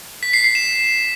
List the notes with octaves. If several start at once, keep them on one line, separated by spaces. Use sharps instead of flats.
B6
C7
C7
E7